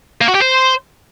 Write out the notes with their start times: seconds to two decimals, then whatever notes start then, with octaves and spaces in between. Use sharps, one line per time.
0.21 A#3
0.28 F#4
0.35 G4
0.42 C5